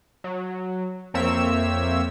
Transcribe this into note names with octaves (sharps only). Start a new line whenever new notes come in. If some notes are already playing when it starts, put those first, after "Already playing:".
F#3
F2 A#3 C4 C#5 E5 E6